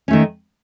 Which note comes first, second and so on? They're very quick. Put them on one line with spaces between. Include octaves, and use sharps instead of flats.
C#4 A3 D#3